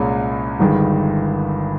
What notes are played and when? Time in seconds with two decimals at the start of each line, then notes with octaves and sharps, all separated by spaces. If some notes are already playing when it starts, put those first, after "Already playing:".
Already playing: C2 A#2 G#3 C#4
0.59 G1 G2 D#3 G#3